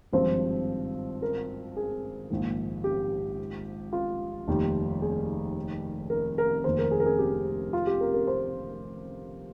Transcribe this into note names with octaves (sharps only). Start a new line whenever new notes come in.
G#1 G2 F3 C4 F4 C5
A#4
G#4
A#1 G#2 D#3
G4
F4
F1 D#2 D#3 G3
G#4
A#4
A#4
F1 D#2 D#3 C5
A#4
G#4
A#4
G#4
G4
F4
G4
A#4
A#4
C5